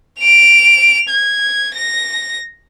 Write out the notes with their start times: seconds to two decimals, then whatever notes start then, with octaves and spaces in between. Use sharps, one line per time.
0.20 D7 F7
1.09 G#6
1.74 A#6